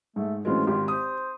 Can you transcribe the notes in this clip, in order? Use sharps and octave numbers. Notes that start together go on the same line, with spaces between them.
G#2 A3
A2 E3 F#3 G#3 C4 C#4 F4
G#1 F4 G4
C5 D#6